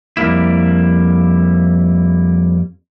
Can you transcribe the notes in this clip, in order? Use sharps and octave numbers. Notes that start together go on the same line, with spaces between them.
F2 G3 A#3 E4